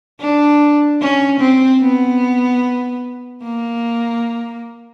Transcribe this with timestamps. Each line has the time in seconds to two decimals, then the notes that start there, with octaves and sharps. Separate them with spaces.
0.20 D4
1.01 C#4
1.40 C4
1.81 B3
3.43 A#3